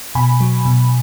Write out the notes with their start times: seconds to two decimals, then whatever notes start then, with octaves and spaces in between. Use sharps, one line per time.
0.15 B2 G#5 B5
0.40 F#3
0.65 B2